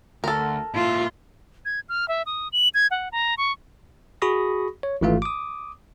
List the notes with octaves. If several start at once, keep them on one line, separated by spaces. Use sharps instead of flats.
D2 A4 A#4
A#2 E4 F4
G#6
F6
E5
D#6
F#7
G#6
F#5
A#5
C#6
F#4 G#4 B5 C#6 D#6 A#6
C#5
G#1 G#2 E3 A3 F4 F5
D6 D#6